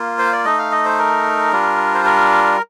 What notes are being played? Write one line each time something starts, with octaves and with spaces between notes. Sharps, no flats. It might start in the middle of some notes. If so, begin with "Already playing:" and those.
Already playing: A#3 F4
C5
D5
A3 D#4 D#5
F5
D#5
C5
A#4
G3 D4 F4
C5
A#4